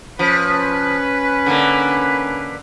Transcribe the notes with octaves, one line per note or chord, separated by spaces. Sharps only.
F3 C#4 B4
D3 A#3